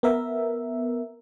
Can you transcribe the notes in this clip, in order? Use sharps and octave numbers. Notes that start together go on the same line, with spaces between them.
B3 A#4 E5